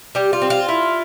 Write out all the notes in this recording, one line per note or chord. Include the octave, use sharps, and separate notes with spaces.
G3 G4
F4
C4
F4
E4